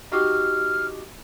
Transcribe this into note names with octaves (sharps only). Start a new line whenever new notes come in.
D#4 F#4 G4 F6